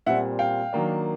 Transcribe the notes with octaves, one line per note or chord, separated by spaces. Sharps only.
A#2 G3 C4 E5 F#5
F5 G5
D#3 F#3 A#3 D4